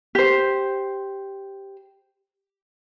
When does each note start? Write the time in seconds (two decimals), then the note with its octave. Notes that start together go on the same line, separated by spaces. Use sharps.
0.15 G4 C5